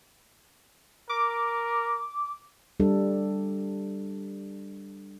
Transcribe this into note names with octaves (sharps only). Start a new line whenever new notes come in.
A#4 D6
G3 D4 A4